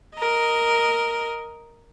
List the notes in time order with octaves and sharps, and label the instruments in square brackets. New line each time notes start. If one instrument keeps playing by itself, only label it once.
[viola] A#4 D#5